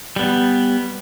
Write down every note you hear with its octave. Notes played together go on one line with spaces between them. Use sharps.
G3 B3